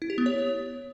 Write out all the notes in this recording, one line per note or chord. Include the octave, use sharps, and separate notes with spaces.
E4
G4
B3
C#5